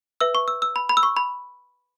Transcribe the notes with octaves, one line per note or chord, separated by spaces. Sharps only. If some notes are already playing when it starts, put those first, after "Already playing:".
B4 E5 E6
C#6
E6
E6
B5
B5
E6
C#6
B5